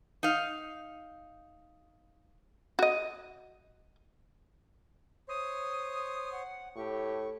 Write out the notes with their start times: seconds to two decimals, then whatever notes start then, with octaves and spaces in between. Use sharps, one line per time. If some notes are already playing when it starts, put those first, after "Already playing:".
0.23 D#4 F5
2.79 F#4 D#5
5.28 C5 C#5 C6 D#6
6.31 F#5
6.76 A2 G4 C#6